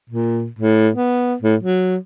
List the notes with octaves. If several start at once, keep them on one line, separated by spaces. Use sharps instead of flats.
A#2
A2
B3
A2
F#3